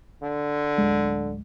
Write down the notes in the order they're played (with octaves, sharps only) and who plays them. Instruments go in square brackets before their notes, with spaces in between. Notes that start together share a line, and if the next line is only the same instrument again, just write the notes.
[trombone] D3
[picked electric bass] D1 G#3